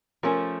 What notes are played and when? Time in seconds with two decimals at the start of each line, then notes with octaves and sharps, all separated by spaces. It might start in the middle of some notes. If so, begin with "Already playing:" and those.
0.23 F3 A3 C#4 A#4